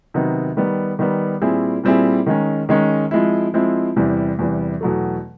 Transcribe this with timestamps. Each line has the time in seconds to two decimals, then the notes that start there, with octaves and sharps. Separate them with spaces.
0.14 C3 D#3 F#3 B3 D#4
0.57 D#3 G3 B3
0.99 D#3 G3 B3
1.41 A#2 G3 C4 E4 G#4
1.84 A#2 G3 C4 E4 G#4
2.26 D#3 G#3 C#4
2.69 D#3 G#3 C#4
3.11 F3 G#3 C4 E4
3.54 F3 G#3 C4 E4
3.96 E2 C3 E3 G3
4.39 E2 C3 E3 G3
4.81 E2 B2 F#3 A3